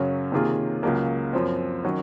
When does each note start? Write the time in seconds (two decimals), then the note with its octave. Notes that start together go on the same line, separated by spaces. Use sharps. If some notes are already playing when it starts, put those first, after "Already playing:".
Already playing: F#2 C#3 F#3 C#4
0.32 C3 D#3 A#3 F4 G#4
0.83 C#2 C#3 F#3 A#3
1.33 F#2 F3 C4
1.84 D#3 F#3 C#4